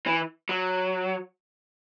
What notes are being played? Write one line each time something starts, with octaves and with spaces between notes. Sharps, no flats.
E3
F#3